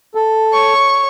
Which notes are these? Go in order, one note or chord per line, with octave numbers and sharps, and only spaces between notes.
A4
C#5 C#6